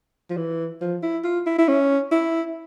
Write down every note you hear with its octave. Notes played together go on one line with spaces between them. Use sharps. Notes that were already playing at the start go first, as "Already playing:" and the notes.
F3
E3
F3
E4
F4
E4
E4
C#4
E4